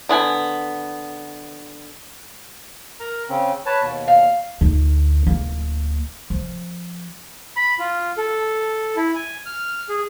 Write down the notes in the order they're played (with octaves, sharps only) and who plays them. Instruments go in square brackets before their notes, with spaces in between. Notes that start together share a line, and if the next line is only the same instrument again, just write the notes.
[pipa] D3 B3 G#5
[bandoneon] A#4 A#5
C#3 C4 C#4
B4 C#5 A5
D#2 B2
[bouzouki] F5
[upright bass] D2 D#4
D1 A#3
F3
[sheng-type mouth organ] B5
F4
A4
E4
G#5
F6
G#4